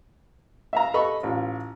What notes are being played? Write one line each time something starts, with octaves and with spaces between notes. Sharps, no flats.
E5 F5 A#5
G4 A4 B4 D#5 B5 C#6
A1 F4